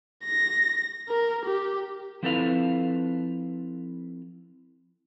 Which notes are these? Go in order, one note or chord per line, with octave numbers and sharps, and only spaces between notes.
A#6
A#4
G4
F3 C4 E4 A4 B4 F5